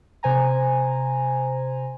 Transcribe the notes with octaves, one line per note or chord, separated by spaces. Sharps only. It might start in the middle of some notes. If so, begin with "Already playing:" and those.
C3 C5 G#5 A#5